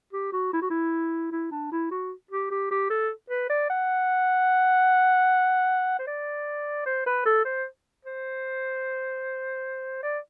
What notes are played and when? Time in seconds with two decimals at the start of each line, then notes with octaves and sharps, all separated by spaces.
0.13 G4
0.33 F#4
0.53 E4
0.62 F#4
0.70 E4
1.32 E4
1.51 D4
1.72 E4
1.91 F#4
2.31 G4
2.51 G4
2.71 G4
2.90 A4
3.30 B4
3.50 D5
3.70 F#5
5.99 C5
6.07 D5
6.86 C5
7.06 B4
7.26 A4
7.45 C5
8.05 C5
10.03 D5